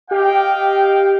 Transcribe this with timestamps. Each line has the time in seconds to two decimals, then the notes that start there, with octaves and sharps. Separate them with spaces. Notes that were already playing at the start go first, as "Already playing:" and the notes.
0.11 G4 D#5 F5 G5